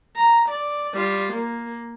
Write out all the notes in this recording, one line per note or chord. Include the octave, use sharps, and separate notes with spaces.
A#5
D5
G3 F4
A#3